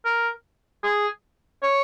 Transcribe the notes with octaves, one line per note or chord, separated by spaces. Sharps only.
A#4
G#4
C#5